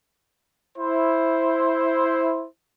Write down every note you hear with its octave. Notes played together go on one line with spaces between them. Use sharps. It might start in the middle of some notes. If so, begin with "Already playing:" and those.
E4 C5